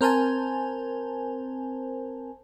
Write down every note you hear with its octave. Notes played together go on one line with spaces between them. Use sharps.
C4 A#4 C5 G#5 A5